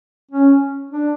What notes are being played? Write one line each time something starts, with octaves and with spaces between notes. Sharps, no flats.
C#4
D4